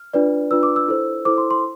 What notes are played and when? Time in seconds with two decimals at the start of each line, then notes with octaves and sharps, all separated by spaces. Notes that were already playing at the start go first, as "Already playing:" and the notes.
Already playing: F6
0.14 D4 F4 B4 D5
0.51 D4 F4 B4 D5 E6
0.63 D6
0.76 E6
0.88 E4 A4 C5
1.25 E4 A4 C5 D6
1.38 C6
1.51 C6